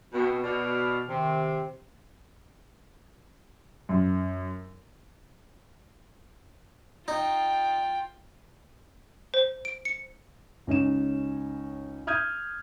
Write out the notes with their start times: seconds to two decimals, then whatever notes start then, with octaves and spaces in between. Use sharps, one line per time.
0.13 B2 C4
0.44 B2 D5 F6
1.09 C3 D#3
3.89 F#2
7.08 D#4 F4 G5
9.34 C5
9.65 D7
9.85 C#7
10.67 C#2 C#4 D#4 E7
12.07 D#6 F6 G6 G#6 D#7